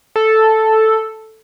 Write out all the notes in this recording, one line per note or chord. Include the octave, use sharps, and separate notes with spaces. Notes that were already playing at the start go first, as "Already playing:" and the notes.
A4